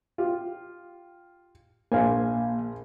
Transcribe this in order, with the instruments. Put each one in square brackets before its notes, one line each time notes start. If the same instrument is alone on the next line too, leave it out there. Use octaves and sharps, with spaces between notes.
[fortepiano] F4 G4
[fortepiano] A#1 C5 G#5 [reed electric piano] A#3 F5